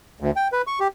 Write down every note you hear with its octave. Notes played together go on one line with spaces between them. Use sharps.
D2
G5
B4
C#6
G4